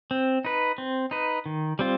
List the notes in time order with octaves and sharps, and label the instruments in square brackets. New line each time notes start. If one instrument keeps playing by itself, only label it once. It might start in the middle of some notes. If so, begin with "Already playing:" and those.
[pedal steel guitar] C4
D#4 B4
C4
D#4 B4
D#3
G3 C4 F4